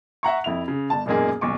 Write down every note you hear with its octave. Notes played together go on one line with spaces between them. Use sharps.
E5 F#5 A#5 C#6
F2 E4 F7
C#3
G1 A5
E1 F#2 A#2 A#3 D#4 G#4
D#1 B1 C#6 D6